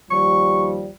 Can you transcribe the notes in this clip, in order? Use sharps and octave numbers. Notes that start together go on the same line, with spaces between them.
D#2 F3 G3 C#6